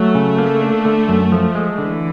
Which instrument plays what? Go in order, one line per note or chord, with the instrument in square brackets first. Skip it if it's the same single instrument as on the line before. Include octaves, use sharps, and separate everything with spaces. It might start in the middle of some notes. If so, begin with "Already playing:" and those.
Already playing: [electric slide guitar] F#3 [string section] A3
[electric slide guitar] C#3
A#3
D4
D3
F#2
F3
G#3
[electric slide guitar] D3 [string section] E3